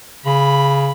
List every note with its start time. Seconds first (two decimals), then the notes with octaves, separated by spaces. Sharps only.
0.25 C#3 B5